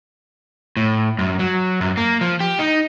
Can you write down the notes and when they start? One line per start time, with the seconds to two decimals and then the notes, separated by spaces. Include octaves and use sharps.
0.77 A2
1.19 F#2
1.39 F#3
1.81 F#2
1.97 A#3
2.21 F3
2.40 G4
2.59 D#4